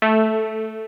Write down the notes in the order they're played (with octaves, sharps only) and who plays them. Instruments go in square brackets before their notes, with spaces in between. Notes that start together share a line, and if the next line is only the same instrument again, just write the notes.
[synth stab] A3